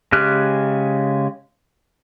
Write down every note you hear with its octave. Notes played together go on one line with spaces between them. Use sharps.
C#3 G#3 G4 F6 F#6